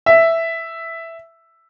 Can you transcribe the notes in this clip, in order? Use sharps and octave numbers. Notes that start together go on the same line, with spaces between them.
E5